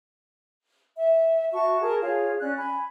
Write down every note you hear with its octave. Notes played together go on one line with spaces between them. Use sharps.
E5
F#4 E5 A5 C#6
G#4 A#4 A5
F4 G#4 C#5
C#4 D5 F#6
G#5 B5